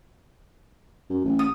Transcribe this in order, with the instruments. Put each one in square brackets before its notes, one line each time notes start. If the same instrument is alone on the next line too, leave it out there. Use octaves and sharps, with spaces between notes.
[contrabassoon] F#2
A1
[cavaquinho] D#6